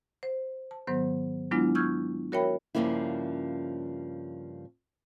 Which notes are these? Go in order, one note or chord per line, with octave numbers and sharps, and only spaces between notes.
C5
A5
G#2 D#3 F#3 B3 C5
F#3 G#3 B3 D4 E4 F4
C#6 E6 F6 G6 G#6
F#4 A#4 C#5 E5 G5 B5
G2 C#3 F3 A#3 C#4 E4